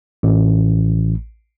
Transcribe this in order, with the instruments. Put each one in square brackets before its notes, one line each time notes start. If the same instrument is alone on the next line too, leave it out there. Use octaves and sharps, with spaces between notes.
[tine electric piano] A1